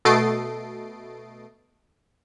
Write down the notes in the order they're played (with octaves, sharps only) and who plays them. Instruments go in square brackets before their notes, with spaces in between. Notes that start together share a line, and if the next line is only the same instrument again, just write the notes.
[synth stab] B2 A3 D#5 A6 C7 D7